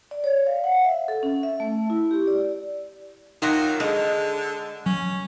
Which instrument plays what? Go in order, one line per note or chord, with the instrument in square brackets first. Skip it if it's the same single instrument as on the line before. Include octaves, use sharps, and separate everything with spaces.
[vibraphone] D5
C#5
F5
F#5
E5
A4
C#4
E5
A3
E4
G4
D5
[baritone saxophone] D#3 [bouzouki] F#3 A#3 F4
[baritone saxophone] D3 [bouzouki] G#3
[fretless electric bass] F#3 [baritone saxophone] C#4